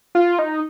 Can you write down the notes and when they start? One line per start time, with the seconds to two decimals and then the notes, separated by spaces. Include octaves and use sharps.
0.15 F4
0.39 D#4